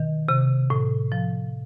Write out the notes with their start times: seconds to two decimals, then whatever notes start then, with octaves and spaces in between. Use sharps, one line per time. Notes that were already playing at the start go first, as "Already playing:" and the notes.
Already playing: B2 D#3
0.29 C3
0.70 A2
1.12 F3